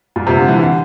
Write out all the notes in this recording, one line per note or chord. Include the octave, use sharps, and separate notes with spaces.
A#2
C3
D3
E3
D3